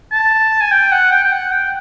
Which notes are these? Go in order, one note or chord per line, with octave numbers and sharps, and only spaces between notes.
A5
G#5
G5
F#5
G5
G5
F#5
G5